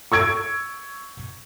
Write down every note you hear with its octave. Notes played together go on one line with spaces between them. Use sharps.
C#6 E6 G#6 D7